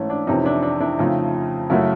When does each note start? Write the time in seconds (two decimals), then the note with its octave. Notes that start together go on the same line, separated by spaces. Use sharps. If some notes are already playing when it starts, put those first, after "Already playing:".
Already playing: G#2 E3 A3 C#4
0.10 D4
0.27 F2 C3 E3 C#4 D#4
0.45 D4 E4
0.63 D4
0.80 D4 E4
0.99 F2 C#3 F3 A3 D#4 F4
1.70 F#2 C#3 F#3 A3 E4 F#4